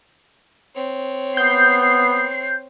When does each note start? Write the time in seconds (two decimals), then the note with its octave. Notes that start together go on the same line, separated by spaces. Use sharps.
0.75 C4 C#5
1.37 B3 G6 C7